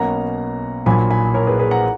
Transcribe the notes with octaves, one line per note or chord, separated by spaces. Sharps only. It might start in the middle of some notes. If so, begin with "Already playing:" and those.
Already playing: B1 B2 A#3 C#4 F#5 A#5
A#1 A#2 F#3 A#3 G#5 B5
G#5 B5
A#4 C#5
G#4 B4
G#4 B4
F#5 A#5